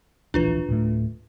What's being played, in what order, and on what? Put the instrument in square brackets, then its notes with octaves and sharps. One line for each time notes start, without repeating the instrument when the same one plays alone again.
[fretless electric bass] D1 A#1 E3 [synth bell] D4 F4 B4
[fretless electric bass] D1 A2 A3